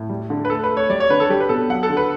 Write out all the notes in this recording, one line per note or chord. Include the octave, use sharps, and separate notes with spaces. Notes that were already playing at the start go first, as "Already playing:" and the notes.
Already playing: A2
G3
D3
B4
A3 A4
B4
A3
C#5
G3 D5
C#5
D3 B4
A4
G3 G4
B4
B2 A4
F#3 F#5
A4
D3
B4